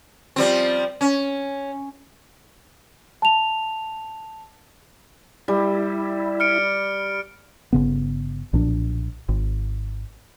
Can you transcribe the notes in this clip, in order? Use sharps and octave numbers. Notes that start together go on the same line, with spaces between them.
F3 G3 C4
C#4
A5 F7
G3 E4
F6 C#7 D7
G1 C#3 B3
B1 A#2 F3 D4
G#1